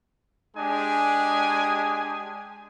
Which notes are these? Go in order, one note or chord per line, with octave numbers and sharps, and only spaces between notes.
G#3 D4 G4 G#4 G#5 D#6